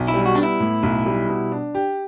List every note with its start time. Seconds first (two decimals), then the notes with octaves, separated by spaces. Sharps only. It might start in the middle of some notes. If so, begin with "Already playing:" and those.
Already playing: B1
0.08 E4
0.14 G3
0.26 F#4
0.35 B3 D4
0.43 E4
0.60 A2
0.83 B1
1.06 G3
1.29 B2
1.52 D4
1.75 G4